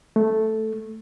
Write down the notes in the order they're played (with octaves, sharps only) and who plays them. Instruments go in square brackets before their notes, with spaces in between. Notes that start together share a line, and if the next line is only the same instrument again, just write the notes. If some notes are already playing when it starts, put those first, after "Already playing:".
[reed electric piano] A3